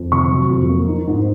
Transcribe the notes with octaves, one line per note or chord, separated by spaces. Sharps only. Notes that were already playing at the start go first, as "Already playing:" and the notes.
Already playing: F2
C3 C#6
F#3
F2
A#3
D#4
G#2